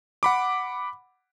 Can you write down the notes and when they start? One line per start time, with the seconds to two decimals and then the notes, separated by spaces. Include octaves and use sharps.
0.23 F#5 B5 D6